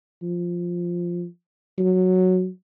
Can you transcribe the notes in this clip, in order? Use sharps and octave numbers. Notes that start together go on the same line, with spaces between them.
F3
F#3